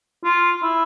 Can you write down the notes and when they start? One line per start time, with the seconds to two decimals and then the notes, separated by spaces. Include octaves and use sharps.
0.24 F4
0.63 E4